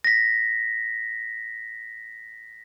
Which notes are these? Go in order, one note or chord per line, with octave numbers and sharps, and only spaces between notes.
A#6 B6